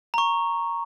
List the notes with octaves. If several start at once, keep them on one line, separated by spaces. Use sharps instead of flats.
A#5 C#6